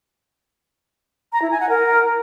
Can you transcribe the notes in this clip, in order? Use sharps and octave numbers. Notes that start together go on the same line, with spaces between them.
A#5
E4
G#5
F#5
A#4